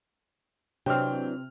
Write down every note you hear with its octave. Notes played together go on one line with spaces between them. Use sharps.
C3 E3 F#3 C4 D4 G5 F6